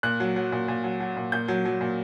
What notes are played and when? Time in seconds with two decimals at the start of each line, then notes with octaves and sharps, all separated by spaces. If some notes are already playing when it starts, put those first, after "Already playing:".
0.03 A#2 F#6
0.20 F#3
0.36 F#3
0.52 A#2
0.68 A#2
0.84 F#3
1.00 F#3
1.17 A#2
1.32 A#2 G6
1.48 F#3
1.65 F#3
1.81 A#2